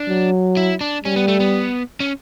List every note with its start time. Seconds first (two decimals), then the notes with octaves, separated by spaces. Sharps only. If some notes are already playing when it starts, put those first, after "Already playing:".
Already playing: D4
0.09 F#3
0.57 E4
0.81 D4
1.04 G3 C#4
1.16 B3
1.28 A3
1.40 B3
2.00 C#4